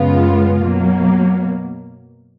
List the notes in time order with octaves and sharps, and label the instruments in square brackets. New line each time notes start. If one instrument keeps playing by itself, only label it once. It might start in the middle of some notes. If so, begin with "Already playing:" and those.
Already playing: [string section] F#2 C#3 G#3 B3 F4
B2 F#3 A#3